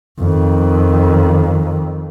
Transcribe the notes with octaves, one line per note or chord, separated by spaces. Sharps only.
F2 D#3